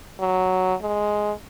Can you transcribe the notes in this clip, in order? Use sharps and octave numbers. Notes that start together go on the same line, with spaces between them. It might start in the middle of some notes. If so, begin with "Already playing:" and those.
F#3
G#3